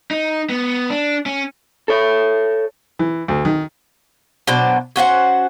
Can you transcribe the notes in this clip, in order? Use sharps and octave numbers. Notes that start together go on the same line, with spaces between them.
D#4
B3
D4
C#4
A4 C#5
E3
D2
D#3
B2 F#3 D4 C5
C#4 F#4 C5 F#5